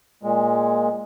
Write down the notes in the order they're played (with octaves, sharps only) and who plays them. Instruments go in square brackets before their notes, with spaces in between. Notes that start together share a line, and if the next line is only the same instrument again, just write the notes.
[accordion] A#2 G#3